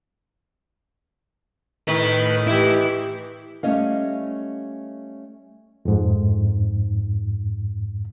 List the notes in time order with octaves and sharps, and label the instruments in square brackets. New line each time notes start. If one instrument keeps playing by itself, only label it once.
[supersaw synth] A2 [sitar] D#3 [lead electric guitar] B4
[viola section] E3 G4 [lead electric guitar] E4
[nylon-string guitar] G3 A3 C#4 D#5 F5
[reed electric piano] F2 G#2